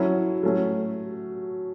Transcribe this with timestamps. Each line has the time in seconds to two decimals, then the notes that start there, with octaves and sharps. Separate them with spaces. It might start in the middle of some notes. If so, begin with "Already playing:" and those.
Already playing: F#3 C#4 E4 A4
0.43 F#3 A3 C#4